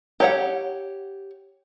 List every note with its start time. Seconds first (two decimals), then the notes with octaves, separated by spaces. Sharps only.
0.20 G4 C#5 F#5